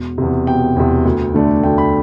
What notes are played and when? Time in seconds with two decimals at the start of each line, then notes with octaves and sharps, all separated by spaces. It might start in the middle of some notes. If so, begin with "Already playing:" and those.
Already playing: E1 F#5
0.18 E2 C3
0.47 E1 G5
0.77 E2 C3
1.05 D2
1.34 D3 A3 D4
1.64 D2 G5
1.78 B5